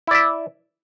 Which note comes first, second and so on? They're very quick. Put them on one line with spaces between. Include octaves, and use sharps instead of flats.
E4 D5 E5